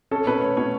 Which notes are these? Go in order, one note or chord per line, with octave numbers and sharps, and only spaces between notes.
C#4 A4
B2 B4
A3 C#5
B2 C#5